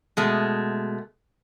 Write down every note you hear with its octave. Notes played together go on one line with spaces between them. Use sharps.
B2 G#3 A3